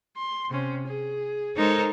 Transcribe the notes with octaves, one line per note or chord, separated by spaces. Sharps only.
C6
C3 C#4
G#4
G#3 D#4 A4 A#4 C5 C#5